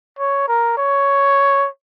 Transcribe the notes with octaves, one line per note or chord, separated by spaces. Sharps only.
C#5
A#4
C#5